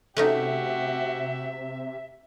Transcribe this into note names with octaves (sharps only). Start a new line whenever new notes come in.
C3 A3 C#4 D#4 F#4 G4 E5